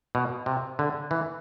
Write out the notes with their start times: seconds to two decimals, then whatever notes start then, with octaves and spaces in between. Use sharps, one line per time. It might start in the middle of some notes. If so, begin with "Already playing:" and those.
0.15 B2
0.46 C3
0.79 D3
1.11 E3